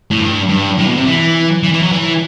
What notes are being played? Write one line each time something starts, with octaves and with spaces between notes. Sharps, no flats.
A2
G2
G2
A2
B2
C3
E3
E3
E3
F#3
E3